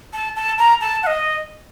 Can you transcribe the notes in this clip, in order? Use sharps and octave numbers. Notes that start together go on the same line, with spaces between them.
A5
A5
A#5
A5
F#5
D#5